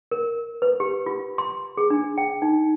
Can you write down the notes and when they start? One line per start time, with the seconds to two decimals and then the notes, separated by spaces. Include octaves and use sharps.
0.11 A#4
0.62 B4
0.80 G4
1.06 F4
1.38 C6
1.77 G#4
1.90 D4
2.18 G5
2.42 D#4